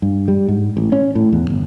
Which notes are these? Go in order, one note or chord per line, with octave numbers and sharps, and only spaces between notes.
G2
G3
G#2
A1
C#4
A2
E2
G1